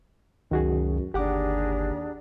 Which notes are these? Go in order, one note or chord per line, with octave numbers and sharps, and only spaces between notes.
C#2 F#2 D#3 F#4 G#4
G1 D#2 D4 G4 G#4 F#5 A#5 D6